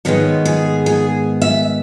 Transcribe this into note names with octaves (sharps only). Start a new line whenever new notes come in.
G#2 D#3 G#3 B3 C#5
G#4
G#4
E5